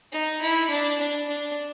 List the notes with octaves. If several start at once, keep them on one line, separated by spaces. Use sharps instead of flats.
D#4
E4
D4
D4
D4